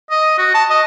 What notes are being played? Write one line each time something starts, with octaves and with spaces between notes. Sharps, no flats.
D#5
F#4
A5
D#5